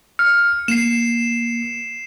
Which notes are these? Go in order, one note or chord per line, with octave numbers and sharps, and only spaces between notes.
F6 C#7
A#3 C7 E7